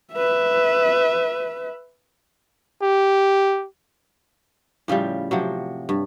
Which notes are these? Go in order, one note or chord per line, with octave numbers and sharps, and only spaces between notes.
B4 E5
G4
A2 C#3 F3 G3
C3 F3 F#3
G2